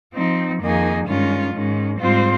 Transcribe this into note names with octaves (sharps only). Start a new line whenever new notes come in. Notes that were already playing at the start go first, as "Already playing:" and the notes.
F3 C4 D#4
F2 D#3 A#3 D#4 G#4
G2 D#3 G#3 C#4 F4
G#2 D#3 G#3 C#4
G#2 G3 C4 F4 C5